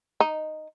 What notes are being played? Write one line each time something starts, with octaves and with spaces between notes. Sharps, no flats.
D#4